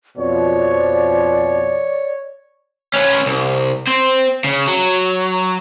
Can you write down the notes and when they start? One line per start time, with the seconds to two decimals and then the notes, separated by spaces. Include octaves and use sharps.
0.18 F2 B2 F3 C#5 D5
2.94 C#4 B4
3.26 C2
3.88 C4 C5
4.44 C#3
4.67 F#3